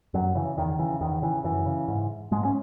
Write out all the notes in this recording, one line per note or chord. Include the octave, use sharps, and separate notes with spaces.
F#2 F#3
C#3 E3
E2 D#3
C#3 E3
E2 D#3
C#3 E3
F#2 E3
C#3
G#2
G#2 G#3
C#4